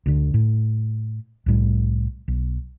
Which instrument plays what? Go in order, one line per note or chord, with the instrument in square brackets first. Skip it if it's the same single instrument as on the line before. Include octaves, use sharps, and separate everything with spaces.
[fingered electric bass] D2 D3
A2
C2 A2 G3
B1